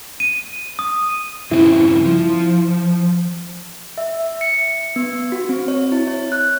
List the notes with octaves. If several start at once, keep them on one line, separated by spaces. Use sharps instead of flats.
D#7
D#6
G2 C#3 C4 E4
F3
E5
C#7
B3
F#4
C4
C#5
E4
C#5
F#6